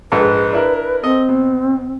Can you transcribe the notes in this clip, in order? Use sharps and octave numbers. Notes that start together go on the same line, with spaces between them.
A#1 G#2 A4 B4
D4 E4 A#4
C4 A4 D#5
B2